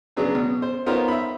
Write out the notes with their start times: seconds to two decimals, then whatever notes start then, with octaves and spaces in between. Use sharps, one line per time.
0.17 C#3 F#3 B3 D4 G#4
0.35 B2
0.62 C5
0.86 B3 D#4 F4 A#4 C5 C#5
1.08 E5 B5